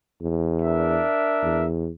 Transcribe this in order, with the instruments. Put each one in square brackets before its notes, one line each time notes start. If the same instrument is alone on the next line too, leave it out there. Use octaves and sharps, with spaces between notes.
[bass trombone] E2
[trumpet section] D4 A#4 E5
[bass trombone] E2